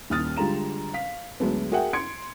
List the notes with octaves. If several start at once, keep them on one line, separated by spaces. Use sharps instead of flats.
D#1 D#2 D#6 F6 A6
D3 G3 G#3 F4 A#5 E7
F5 B6
D2 F#3 G#3 A3 B3
F#4 G#4 A#4 E5 F#5 G5
C6 G#6 C#7 D7